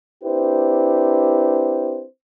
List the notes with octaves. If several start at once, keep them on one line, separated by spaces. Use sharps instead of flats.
C4 D4 E4 G4 B4 C5